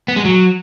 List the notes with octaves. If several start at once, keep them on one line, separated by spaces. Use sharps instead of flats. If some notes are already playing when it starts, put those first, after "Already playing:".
B3
G#3
F#3